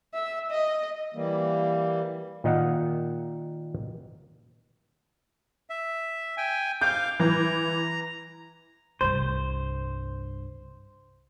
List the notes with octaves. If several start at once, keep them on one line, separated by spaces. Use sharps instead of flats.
E5
D#5
E3 G3 A#3
A#2 D#3 D#4 F5 F#5
E5
G5 G#5
F5 D6 G6
E3 A#5
C2 G2 C5